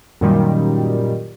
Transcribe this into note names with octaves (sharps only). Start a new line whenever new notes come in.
F#2 A#2 D#3 G3